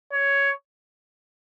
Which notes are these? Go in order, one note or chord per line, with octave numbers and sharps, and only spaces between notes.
C#5